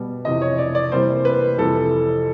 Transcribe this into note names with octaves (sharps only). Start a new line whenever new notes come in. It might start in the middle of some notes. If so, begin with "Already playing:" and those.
Already playing: B2 G3 B3
F2 C3 E3 D#5
C#5
D5
D5
C3 E3 G3 A#3 C5
B4
F2 C3 E3 G3 A4